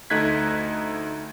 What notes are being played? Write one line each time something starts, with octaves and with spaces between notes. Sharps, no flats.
D2 A3 D#4 F#6 G#6 B6